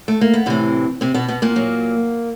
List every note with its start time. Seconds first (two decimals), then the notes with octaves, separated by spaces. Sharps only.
0.08 A3
0.21 A#3
0.33 B3
0.46 A2 C3 E3 C4
1.01 C3 C4
1.14 B2 B3
1.28 B2 B3
1.42 A#2 A#3
1.56 A#2 F#3